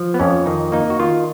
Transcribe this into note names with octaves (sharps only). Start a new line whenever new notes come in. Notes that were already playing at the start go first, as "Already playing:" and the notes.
Already playing: F3
B3
F2 C#4
D#3 D#4
A#3 D#4
F#4
D#3 F4